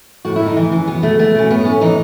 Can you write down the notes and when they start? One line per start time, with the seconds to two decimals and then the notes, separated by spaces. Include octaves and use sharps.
0.25 A2 F#4
0.36 E4
0.41 A2 D#4
0.57 E3
0.72 E3 C#4
0.87 B2 B3
1.03 B2 A3
1.19 B2 A3
1.35 B2 C#4
1.50 A2 B3
1.65 A2 C#4
1.81 E3 D#4